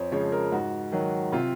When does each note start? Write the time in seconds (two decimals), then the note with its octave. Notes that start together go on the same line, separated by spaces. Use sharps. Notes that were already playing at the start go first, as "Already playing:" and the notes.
Already playing: F2 C5 C#5
0.12 C#3 F3 G#3 C#5
0.32 A#4
0.52 G#2 F#4
0.92 D#3 F#3
1.32 C3 F4